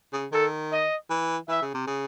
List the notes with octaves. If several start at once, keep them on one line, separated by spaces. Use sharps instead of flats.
C#3
D#3 A4
D#5
E3
E3 E5
C#3
C3
C#3